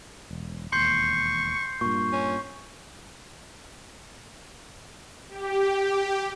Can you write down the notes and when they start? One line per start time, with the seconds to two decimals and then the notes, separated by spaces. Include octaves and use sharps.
0.31 E1
0.72 E1 D#2 C6 C#6 G6 C7
1.81 G2 A#2 C#6
2.13 C#4
5.29 G4